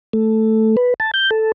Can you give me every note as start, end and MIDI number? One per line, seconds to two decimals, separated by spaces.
0.13 0.76 57
0.77 0.94 71
1.00 1.11 81
1.14 1.30 91
1.31 1.52 69